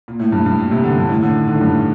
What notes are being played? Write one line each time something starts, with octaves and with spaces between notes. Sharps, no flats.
A#2
A2
G2
G2
A#2
C3
D3
G2
A2
D3
D#3
D3
A2
G2